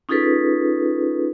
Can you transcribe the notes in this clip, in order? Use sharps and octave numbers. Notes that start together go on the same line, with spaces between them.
C#4 D#4 F4 G#4 A4 B4